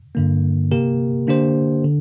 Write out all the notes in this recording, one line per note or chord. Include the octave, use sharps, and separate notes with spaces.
G2 D3 A#3
C3 A#3 G4 A#4
D3 A#3 D4 G4 C5
D3